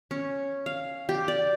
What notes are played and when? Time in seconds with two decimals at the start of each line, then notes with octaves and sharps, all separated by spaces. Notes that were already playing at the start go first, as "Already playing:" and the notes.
0.11 C#4
0.66 F5
1.09 G4
1.28 D5